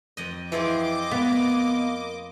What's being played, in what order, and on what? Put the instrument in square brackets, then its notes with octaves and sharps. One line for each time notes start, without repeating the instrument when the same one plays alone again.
[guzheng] F2 D#5
[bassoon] E3 [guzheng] F3 C4 G#4 [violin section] D#5 D6
[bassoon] A#3 [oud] B3